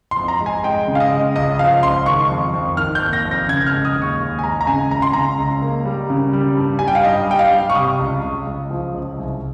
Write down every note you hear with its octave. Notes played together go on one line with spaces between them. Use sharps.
C6
F2
A#5
G#3
G#5
G#3 G5
C#3
F5
D#5
G#3
C#2 D#5
F3 F5
C#2 C6
D#3 C#6
F2
F2
D#3 F6
G6
A#3
A#6
F2
A#6
C#3 G#6
F6
G#3
D#6
D#2
C#6
D#2
G#5
G#3 A#5
A#5
C#3 G#5
C#2 A#5
C6
C#3 A#5
C#2
A#3
G3
C#3
G3
G2
G3 G#5
G5
F5
G2 D#5
G3 G5
F5
G3
C#6
C3 D#6
C#2
C#2
C#2
F3
C#2
C2